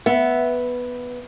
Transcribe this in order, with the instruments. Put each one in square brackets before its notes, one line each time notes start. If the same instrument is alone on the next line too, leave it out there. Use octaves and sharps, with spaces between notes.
[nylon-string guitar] B3 [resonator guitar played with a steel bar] E5